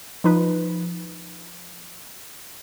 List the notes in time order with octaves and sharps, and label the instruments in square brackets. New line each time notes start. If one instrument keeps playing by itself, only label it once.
[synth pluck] F3 D#4 B4